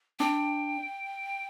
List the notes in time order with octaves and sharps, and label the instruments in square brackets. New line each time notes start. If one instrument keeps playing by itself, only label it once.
[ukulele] D4 [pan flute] G5